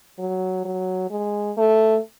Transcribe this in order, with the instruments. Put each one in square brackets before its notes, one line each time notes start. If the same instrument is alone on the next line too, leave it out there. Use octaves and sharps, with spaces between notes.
[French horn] F#3
F#3
G#3
A3